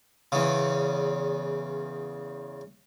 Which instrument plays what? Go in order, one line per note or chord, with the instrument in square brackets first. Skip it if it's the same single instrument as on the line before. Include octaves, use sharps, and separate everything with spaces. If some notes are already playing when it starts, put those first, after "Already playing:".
[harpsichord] E2 C#3